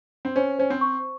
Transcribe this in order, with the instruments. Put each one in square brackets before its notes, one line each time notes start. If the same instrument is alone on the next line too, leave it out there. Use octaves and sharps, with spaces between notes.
[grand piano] C4
[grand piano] C#4 [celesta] C5
[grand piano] C#4 [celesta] C5
[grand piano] C4
[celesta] C#6